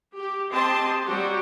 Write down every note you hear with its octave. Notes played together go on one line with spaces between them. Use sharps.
G4
C4 G4 D#5 A5 C6
F#3 G3 F#4 G4